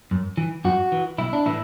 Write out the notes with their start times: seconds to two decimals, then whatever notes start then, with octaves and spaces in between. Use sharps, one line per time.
0.11 F#2
0.37 E3
0.65 F#2 F#4
0.92 E3
1.18 B1 E4
1.33 D4
1.46 A2 E3 E4